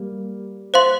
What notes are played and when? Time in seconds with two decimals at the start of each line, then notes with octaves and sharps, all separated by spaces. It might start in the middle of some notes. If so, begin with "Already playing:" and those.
Already playing: G3 A#3
0.74 C5 F5 C6